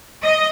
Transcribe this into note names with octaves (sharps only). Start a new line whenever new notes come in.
D#5